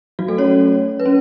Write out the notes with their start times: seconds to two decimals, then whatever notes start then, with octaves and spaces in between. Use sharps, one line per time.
0.19 F#3 F#4
0.28 A3 A4
0.38 C#4 C#5
1.00 B4
1.06 C#4